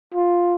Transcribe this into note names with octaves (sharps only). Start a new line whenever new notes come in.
F4